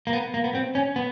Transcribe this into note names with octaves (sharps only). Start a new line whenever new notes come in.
A#3
B3
A#3
B3
C4
C#4
B3